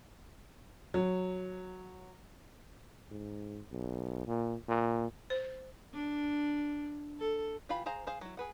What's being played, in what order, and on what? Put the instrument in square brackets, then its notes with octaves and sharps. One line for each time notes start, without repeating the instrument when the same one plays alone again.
[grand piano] F#3
[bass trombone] G#2
B1
A#2
A#2
[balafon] C5
[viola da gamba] D4
A4
[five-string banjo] E3 F4 G4 F5 B5
G#4 C5 F5 A#5
G#4 C5 F5
F#3 E4
G#4 B4 F#5